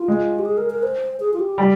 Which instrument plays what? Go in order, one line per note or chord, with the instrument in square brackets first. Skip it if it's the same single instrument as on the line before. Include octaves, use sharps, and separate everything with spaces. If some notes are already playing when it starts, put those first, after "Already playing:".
Already playing: [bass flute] F4
[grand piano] G#3
[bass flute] G4
G#4
A#4
A#4
C5
G#4
F4
G4
[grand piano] G3